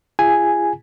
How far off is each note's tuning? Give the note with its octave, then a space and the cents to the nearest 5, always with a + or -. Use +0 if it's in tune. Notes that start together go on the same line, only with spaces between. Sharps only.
F4 -40 G#4 -25 G#5 +0